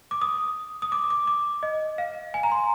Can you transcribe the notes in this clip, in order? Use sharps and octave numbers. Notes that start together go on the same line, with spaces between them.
D6
D#6
D#6
D6
D6
D6
D#5
F5
G#5
A#5
C6